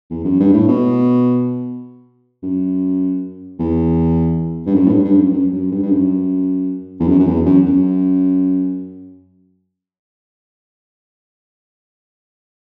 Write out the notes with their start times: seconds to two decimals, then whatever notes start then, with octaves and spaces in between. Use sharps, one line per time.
0.10 E2
0.24 F#2
0.39 G2
0.54 A2
0.68 B2
2.43 F#2
3.59 E2
4.66 G2
4.75 F#2
4.86 A2
4.89 G2
5.04 G2
5.18 F#2
5.33 F#2
5.53 F#2
5.71 G2
5.82 G2
5.92 F#2
7.00 E2
7.08 F#2
7.20 F#2
7.27 E2
7.46 F#2
7.66 F#2